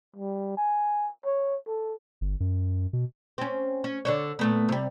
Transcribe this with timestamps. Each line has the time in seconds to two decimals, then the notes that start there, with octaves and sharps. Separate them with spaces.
0.16 G3
0.57 G#5
1.25 C#5
1.67 A4
2.21 G1
2.40 F#2
2.93 B2
3.38 C4 C#4
3.84 C#4
4.05 D3 D4 C#5
4.39 A#2 A3 B3
4.69 C3 G3